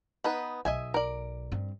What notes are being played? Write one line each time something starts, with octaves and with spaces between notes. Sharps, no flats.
B3 D#4 B4
B1 D#5 E5 G#5
A#4 D5
G2 C4